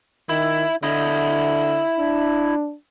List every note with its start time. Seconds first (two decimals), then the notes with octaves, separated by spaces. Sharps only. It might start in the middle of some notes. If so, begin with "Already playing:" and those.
0.29 D#3 E4
0.83 D3 E4 D#5
1.99 D4